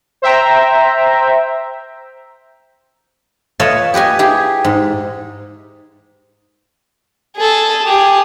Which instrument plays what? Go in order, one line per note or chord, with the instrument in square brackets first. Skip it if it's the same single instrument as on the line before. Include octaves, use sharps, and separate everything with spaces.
[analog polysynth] C5 E5 G5 A#5
[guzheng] F4 A4 B4 C#5 D#5 E5
G4 B4 D#5 G#5
E4 G4 G#4
G#2
[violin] G#4 A4
G4 G#4